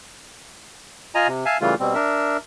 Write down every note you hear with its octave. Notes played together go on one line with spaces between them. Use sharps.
F4 D#5 G#5 A#5
C3
E5 F5 G#5 A5
C#3 E3 G3 A3 F4
B2 G3 C4
D4 A#4 E5